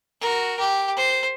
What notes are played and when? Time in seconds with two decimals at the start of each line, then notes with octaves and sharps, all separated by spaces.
0.21 F#4 A#4
0.59 G4
0.96 C5